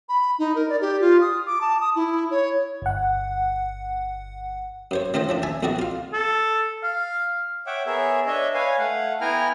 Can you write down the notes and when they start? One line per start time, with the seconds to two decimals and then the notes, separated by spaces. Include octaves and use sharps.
0.09 B5
0.39 D#4
0.56 A#4
0.69 D5
0.81 G4
1.01 F4
1.21 D#6
1.46 D6
1.61 A5
1.81 D#6
1.96 E4
2.31 C#5
2.82 G1 F#5
4.91 F#2 C5 C#5
5.14 D#3 A3 C#4 F4 C5 D#5
5.29 E3 F3 D4
5.43 E5 G#5 A5
5.63 B1 F2 C4 F#4 D5 D#5
5.79 F4 F5
6.13 A4
6.83 F5
7.67 C#5 E5 F#5 G5 D6
7.86 B3 G#4 A#4 C#5 E5
8.26 D4 C#5 D#5 E5
8.54 B4 C#5 F5 G#5
8.78 A3 F5 F#5
9.21 B3 E4 G5 G#5 A#5 F6